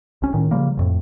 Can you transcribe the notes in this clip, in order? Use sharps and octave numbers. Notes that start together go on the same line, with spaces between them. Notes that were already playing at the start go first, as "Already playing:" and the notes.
C2 C#4
A2 D#3
C#3 F3 G3 A#3
A1 F2 A2